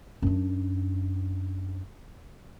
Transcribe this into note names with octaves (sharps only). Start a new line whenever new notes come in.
F#2 D4